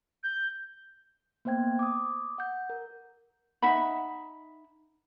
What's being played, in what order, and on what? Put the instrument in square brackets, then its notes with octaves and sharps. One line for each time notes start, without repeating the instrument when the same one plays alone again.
[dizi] G6
[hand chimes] A#3 B3 C5 G5 G#6
D6 D#6
F#5 G6
A#4
[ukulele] D#4 E5 F#5 B5